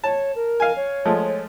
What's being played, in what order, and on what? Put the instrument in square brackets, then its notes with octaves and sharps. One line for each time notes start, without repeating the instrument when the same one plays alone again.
[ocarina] C#5 [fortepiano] A5
[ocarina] A#4
[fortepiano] F5 G#5
[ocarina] C#5
[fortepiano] F3 G#3 A3